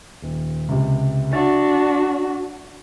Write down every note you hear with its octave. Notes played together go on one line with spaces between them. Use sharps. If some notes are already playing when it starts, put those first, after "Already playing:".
D#1
C#2 C3
D4 F#4 E5 A6